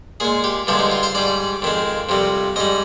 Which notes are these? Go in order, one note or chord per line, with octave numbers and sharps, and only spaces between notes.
A#2 G#3 G#4
G4
G2 D3 F3 G#3 G4
D#4
F4
C5
G#2 G3 D5
F2 D#3 G#3
F2 C3 G3
G#2 G3 D#5